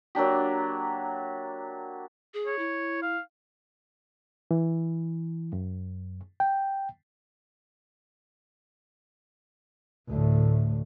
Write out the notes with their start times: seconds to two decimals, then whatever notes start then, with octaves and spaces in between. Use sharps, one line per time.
0.15 F#3 A#3 D4 G4
2.34 G#4
2.46 C#5
2.59 E4
3.02 F5
4.51 E3
5.53 F#2
6.40 G5
10.09 D2 A2